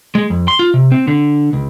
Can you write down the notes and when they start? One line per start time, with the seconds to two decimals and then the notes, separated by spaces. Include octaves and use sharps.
0.15 G#3
0.30 F2
0.48 C6
0.59 F4
0.74 C3
0.91 C4
1.08 D3
1.53 C#2